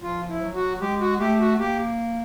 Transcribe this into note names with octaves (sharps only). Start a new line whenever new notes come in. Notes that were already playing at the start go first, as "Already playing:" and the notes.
F3 F4
E4
F#3
F#4
G#3 G4
F#4
A3 G4
F#4
A#3 G4